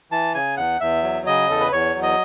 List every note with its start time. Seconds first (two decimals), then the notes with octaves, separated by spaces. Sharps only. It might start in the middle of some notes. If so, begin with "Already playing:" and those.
0.11 E3 A5
0.34 C#3 G#5
0.57 E2 F#5
0.80 E2 E5
1.03 F#3
1.26 C#3 D#5
1.50 E2 A4
1.61 B4
1.72 E2 C#5
1.95 F#3
2.03 D#5